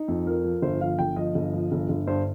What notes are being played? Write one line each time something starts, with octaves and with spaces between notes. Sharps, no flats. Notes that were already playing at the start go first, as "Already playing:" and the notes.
Already playing: D#4
F2
F3 A#4
F3
G1 C5
F3 F5
G1 G5
F3 D#5
G1
F3
G1
G1
G2 C5